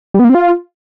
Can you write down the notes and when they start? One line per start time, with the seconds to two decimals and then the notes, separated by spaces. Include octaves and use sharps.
0.14 G3
0.19 B3
0.24 A#3
0.30 C4
0.35 F4